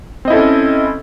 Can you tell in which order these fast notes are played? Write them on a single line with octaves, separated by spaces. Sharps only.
C4 D#5 E4 A4 C#4